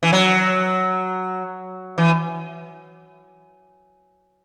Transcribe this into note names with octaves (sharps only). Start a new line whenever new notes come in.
E3
F#3
E3